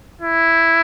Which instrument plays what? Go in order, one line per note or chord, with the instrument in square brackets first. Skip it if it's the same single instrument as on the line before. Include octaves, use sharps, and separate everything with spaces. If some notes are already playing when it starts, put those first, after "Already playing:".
[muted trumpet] E4